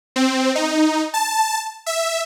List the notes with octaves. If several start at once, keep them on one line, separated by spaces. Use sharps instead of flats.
C4
D#4
A5
E5